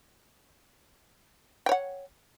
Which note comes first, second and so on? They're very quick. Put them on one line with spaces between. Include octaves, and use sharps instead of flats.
G5 C#5 F#5